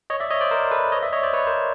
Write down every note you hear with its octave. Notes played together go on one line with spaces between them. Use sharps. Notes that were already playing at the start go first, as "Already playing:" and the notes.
C#5 D#5
D5 E5
C#5 D#5
C5 D5
A#4 C5
A4 B4
C#5 D#5
D5 E5
C#5 D#5
C5 D5
B4 C#5
A#4 C5